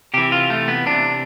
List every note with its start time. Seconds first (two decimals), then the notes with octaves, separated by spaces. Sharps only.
0.14 C3 E3 G4
0.32 F4
0.50 A3
0.68 B3
0.86 C3 E3 D4